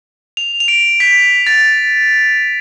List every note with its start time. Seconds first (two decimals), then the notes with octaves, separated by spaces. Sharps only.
0.37 F7
0.60 F7
0.68 D7
1.00 B6
1.47 A6